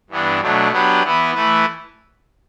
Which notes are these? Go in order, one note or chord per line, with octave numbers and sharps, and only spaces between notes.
G2 E3 B3 D4
B2 F#3 A3 D4
F#3 B3 D4 G4 B4
E3 B3 E4 B4
E3 A3 E4 B4